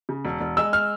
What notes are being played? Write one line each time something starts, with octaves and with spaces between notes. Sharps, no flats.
C#3
E1
E1
G#3 E6
F6